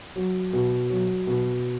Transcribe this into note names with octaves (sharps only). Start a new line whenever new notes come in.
F#3
B2
F#3
B2